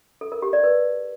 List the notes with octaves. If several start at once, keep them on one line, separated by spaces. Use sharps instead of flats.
A4
A#4
G4
D5
B4